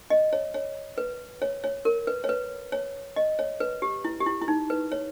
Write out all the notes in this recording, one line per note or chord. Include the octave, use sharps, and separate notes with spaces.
D#5
C#5
C#5
B4
C#5
C#5
A#4
B4
C#5
B4
C#5
D#5
C#5
B4
G4
E4
G4
E4
E4
D#4
B4
C#5